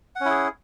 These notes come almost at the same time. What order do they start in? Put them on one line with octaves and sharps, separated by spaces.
F#5 C#4 E4 G#4